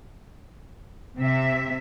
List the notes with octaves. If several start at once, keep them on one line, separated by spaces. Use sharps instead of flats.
C3 E5